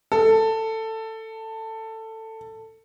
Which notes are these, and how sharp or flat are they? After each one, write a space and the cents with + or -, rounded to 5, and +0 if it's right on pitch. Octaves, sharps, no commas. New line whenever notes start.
A4 +15